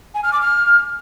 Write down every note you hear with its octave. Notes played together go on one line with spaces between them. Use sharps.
G#5
F6
D6
F6